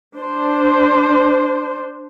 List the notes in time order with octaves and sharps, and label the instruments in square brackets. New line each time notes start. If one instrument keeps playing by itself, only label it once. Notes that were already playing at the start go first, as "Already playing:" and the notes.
[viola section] D4 C5